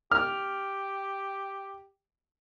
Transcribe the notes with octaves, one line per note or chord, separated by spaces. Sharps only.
G4 F6